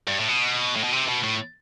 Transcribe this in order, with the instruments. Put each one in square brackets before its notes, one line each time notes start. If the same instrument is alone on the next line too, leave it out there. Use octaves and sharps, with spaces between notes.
[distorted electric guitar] G2
A2
B2
A2
B2
C3
B2
A2